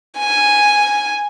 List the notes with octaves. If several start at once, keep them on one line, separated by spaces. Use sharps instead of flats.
G#5